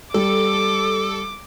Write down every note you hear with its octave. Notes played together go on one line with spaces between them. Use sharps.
G3 A4 D6